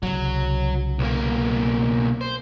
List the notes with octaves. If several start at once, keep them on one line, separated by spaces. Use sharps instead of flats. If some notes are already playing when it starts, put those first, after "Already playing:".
C2 C#3 F#3
B1 A#3
C5